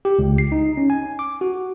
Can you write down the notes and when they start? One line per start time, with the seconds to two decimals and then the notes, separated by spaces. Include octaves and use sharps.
0.05 G4
0.19 C#2
0.38 C7
0.52 D#4
0.77 C#4
0.90 G#5
1.19 D6
1.41 F#4